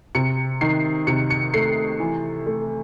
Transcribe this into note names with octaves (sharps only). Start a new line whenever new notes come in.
C3 C#7
D#3 C7
C3 C#7
C#7
A3 C7
E3
A3